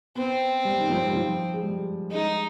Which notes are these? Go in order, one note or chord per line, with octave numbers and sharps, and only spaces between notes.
B3 C4
G3
D#3
F3
G3
F3
G#3
G3
G#3 D#4